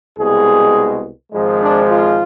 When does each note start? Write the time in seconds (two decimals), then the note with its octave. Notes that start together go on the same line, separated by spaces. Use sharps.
0.17 C2 B2 G#3 G#4
1.32 G#1 G#2 F3 G#3
1.61 D4
1.91 F4